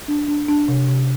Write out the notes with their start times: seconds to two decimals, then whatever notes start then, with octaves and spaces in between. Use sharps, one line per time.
0.08 D4
0.28 D4
0.48 D4
0.68 C3
0.88 C3